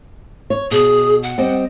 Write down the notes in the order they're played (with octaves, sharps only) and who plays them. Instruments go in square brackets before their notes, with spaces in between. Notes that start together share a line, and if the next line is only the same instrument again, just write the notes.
[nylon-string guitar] C#5
[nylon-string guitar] B2 [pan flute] G#4
[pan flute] F#5
[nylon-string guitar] G3 C4 D#5